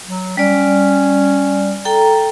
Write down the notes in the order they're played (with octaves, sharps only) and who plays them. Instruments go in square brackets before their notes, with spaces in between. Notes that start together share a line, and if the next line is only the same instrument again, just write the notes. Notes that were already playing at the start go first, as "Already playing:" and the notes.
[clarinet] F#3
[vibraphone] G3 D5 [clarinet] C#4
[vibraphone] A4 G5 A#5